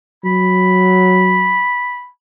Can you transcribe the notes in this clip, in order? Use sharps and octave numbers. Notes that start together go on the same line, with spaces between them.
F#3 B5